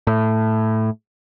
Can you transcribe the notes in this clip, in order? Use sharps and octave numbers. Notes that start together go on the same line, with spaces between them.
A2